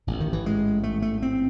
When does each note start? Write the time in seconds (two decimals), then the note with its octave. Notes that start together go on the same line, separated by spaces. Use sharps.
0.07 A1 G#2
0.20 D#3
0.33 E3
0.46 G#3
0.83 A3
1.02 A3
1.22 C4